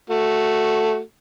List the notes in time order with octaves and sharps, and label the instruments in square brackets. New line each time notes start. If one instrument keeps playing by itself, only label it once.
[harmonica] A3 F#4